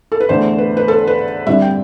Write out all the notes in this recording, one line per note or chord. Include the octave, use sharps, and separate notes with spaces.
A4
B4
E2 D3 A3 C5
B4
B4
A4
B4
G2 D3 G3 C4 E5
G5